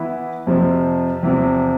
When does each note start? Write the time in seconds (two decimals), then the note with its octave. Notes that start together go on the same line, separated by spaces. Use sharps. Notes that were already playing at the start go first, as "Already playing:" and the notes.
Already playing: E3 B3 E4 B4
0.47 F2 C3 F3
1.23 E2 C3 F3